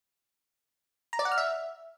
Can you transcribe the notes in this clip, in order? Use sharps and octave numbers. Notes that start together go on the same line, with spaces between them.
A#5
D5
F#5
F6
E5